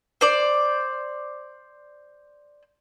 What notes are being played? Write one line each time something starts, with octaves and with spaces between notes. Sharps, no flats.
C5 D5